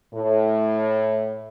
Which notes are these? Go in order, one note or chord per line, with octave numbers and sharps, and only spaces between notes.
A2